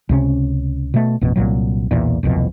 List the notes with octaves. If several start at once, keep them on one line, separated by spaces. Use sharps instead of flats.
C#2 C3 C#4
B2 A3
A1 F2 B2
C2 A#2 F#3
B1 E2 A#2
D1 C2 F2 B2